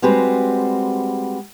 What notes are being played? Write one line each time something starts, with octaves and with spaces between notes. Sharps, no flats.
G3 G#3 C4 F#4 B4